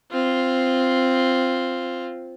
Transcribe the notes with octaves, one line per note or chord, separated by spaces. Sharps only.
C4 F4